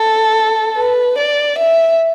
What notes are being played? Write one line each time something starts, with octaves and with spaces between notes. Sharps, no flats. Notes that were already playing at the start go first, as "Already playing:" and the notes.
Already playing: A4
B4
D5
E5